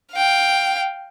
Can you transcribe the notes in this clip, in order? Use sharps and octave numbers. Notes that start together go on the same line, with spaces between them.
F5 G5